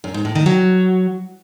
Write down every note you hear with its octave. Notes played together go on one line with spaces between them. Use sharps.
F#2
G#2
A2
D#3
F#3